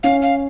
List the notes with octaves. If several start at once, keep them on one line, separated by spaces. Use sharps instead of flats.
C#4 F5
F5